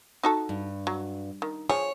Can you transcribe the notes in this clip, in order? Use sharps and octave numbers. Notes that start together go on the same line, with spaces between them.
D#4 F#4 A4
G2
F#3
D#3
F3 G#4 C#5